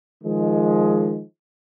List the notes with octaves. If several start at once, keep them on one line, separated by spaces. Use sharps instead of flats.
D#3 F3 G#3